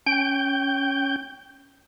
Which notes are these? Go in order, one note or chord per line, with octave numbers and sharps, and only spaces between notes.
C#4 G5 G6